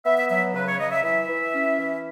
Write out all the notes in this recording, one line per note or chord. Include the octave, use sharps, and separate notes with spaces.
B3 E5
E5
F#3 E5
C#3 B4
C#5
F#3 D#5
E5
E3 E5
E3
C#4
E3